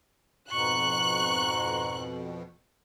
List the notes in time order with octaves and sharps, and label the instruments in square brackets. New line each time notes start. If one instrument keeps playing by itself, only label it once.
[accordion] F2 B2 [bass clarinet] G#2 [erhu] C#6 [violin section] F#6